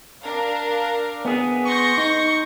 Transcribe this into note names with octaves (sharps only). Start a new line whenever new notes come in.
D4 A#4 F5
B3 G#4
C6 C#6 G6 A#6
D#4 C#6